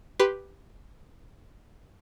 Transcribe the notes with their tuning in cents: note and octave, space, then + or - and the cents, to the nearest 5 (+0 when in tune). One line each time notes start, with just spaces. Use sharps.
G4 +0 B4 +0 C6 +0